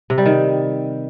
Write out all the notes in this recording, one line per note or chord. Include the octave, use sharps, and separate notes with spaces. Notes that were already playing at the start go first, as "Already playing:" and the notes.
C3
G3
D#3